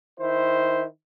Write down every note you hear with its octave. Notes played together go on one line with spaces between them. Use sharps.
D#3 E4 C5